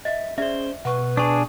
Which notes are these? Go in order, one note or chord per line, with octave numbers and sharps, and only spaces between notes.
D#5 E5
C#4 G#4 C5 D5 E5
B2 B4 F#5 C#6
D4 G#4 A5 C#6